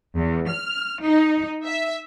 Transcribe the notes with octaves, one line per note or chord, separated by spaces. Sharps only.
E2
F6
D#4
E5